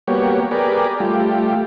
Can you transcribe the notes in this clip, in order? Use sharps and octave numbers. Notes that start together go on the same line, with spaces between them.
G3 A#3 B3 F#4 G4 C#5
G4 G#4 A#4 B4 D5
G3 A3 F4 G4